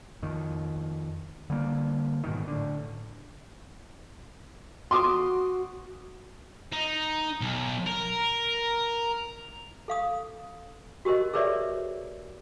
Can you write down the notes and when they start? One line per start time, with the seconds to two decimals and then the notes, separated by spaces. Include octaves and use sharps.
0.23 F2 D#3
1.50 D3 G3 A#3
2.24 G#2 B2 D#3
2.48 A2 D3
4.91 F#4 C6 D6 D#6
6.73 D#4
7.41 B1
7.87 A#4
9.88 A4 F5 D#6
11.05 F#4 G4 A#4 C5 D#5
11.33 G#4 A#4 B4 C#5 D5 E5